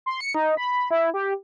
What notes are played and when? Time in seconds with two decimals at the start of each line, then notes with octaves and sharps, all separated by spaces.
0.06 C6
0.20 C#7
0.35 D#4
0.57 B5
0.90 E4
1.14 G4